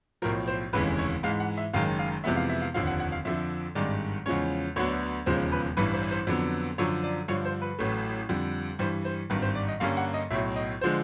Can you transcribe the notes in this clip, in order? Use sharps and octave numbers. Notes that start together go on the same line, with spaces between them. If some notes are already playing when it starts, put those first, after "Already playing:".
B1 A2 F3 A#4
C5
F1 D#2 C#3 E3 G#3 B4
C#5
G#2 E3 G#3 F5
F#5
E5
F#1 F#2 D#3 G#3 F5
F5
F2 C3 E3 G#3 B3 E5
F5
E5
F5
F1 D#2 D3 F3 F5
F#5
F#5
F5
F2 D3 F3 E5
G#1 G2 D#3 G#3 D5
E2 C#3 F3 G#3 C#4 C#5
D2 D3 F#3 B3 D4 C#5
E1 D#2 C#3 F3 G#3 C5
B4
A1 G2 E3 B4
C5
C5
F2 D3 F#3 B3
F#2 D3 F3 C#5
D5
G2 D3 F3 C#5
C5
B4
A1 A2 F#3 A3
F2 D3 G3
G2 E3 G3 C5
C5
G#1 G2 D#3 B4
C5
D5
D#5
G2 D3 G3 A#3 C#4 F5
F#5
D#5
B1 A2 F#3 E5
D#5
D3 F3 G#3 C5